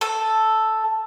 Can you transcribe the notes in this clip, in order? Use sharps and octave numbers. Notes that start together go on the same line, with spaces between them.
A4